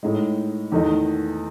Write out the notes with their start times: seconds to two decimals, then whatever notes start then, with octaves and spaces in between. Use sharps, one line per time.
0.03 A2 G#3 D#4
0.72 E2 D#3 A3 D#4